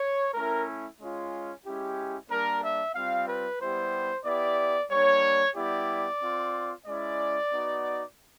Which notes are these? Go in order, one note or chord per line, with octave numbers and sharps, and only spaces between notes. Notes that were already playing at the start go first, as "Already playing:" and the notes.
Already playing: C#5
A3 C#4 E4 A#4
G#3 C#4 F4
G#3 C#4 E4 G4
G3 A#3 D4 A#4
E5
G3 C4 F4 F5
B4
G3 B3 E4 G4 C5
B3 E4 G4 D5
G3 A#3 D4 C#5
G3 B3 E4 G4 D5
C4 F4
G#3 C#4 E4 D5
B3 D#4 F#4